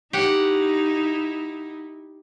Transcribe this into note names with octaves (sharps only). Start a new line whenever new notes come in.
D#4 E4 G4 F#5